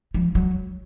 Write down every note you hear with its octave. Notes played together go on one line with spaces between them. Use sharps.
F3
F#3